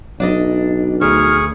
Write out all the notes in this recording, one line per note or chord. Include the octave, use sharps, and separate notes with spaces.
B1 D4 D5 D#5
D2 G#4 C#6 F6